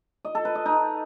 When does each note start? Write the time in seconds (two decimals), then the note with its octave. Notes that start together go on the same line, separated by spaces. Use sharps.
0.25 D#5
0.35 A4
0.45 B4
0.55 D#5
0.66 D#4